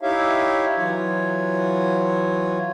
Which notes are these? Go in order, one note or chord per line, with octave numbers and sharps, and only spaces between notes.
D#4 E4 G4 C#5 E5 F5
E3 F#3 F4 C#5